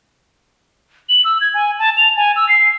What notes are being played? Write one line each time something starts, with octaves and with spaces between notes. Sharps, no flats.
F#7
E6
G#6
G#5
A5
F7
G#5
E6
C7